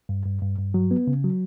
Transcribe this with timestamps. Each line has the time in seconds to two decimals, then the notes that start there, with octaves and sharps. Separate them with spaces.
0.09 G2
0.26 G2
0.42 G2
0.58 G2
0.74 F#3
0.91 B3
1.07 C#3
1.24 F#3